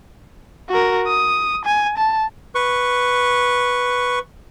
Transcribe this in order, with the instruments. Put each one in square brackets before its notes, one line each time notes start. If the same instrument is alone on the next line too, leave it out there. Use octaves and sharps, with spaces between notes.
[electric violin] F#4 A#4
D#6
G#5
A5
[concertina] B4 C#6